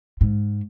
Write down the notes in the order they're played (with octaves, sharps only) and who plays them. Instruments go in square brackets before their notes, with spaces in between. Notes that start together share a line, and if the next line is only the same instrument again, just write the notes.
[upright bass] G#2